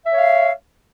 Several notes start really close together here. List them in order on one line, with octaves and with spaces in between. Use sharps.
E5 C#5 F5